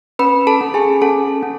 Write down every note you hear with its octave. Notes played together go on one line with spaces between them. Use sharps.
C#4 B4 B5
A4 A5
C#4
G#4 G#5
C#4 A4 A5
C#4